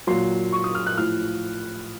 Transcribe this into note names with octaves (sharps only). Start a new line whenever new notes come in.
A#2 F#3 C6
C#6
D#6
F6
F#6
A2 F3 F6